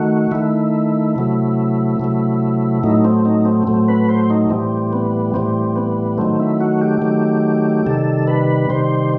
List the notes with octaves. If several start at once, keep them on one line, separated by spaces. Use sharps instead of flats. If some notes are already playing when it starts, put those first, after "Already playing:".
Already playing: D#3 A3 F#4
D#3 A3 E4
C3 F#3 A3
C3 F#3 A3
A2 F#3 A3 D#4
C4
D#4
C4
A2 F#3 A3 C4
B4
C5
D#4
A2 E3 G3 C4
B3
A2 E3 G3 C4
B3
D#3 F#3 A3 C4
E4
F#4
G4
D#3 F#3 A3
C3 D#3 G3 A4
B4
C3 D#3 G3 C5